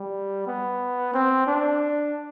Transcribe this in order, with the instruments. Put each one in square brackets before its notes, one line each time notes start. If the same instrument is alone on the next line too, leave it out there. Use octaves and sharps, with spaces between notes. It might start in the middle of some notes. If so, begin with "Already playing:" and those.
Already playing: [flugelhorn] G3
B3
C4
D4